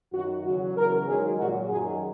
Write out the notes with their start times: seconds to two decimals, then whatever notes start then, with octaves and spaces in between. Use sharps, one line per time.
0.14 F#2 D#3 F#3 F#4
0.45 E2 C#3 F#3 F#4
0.76 E2 C#3 F#3 A#4
1.07 G#2 D#3 F#3 G#4
1.38 A#2 F#3 F#4
1.69 F#2 D#3 F#3 G#4